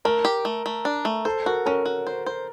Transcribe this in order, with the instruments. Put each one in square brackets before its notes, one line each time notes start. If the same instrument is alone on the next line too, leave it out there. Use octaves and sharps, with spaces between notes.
[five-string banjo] A3 [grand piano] A#4
[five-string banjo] G4
A3
A3
D4
A3
[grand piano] A4 [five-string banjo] C5
[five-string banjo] F#4 [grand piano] A#4
[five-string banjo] C#4 [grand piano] A#4
[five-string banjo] F#4
C5
C5